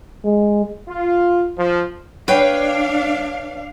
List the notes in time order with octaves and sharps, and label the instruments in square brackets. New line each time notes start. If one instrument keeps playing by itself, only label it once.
[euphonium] G#3
[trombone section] F4
F3
[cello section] D4 F5 [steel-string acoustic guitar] B4 C#5 G5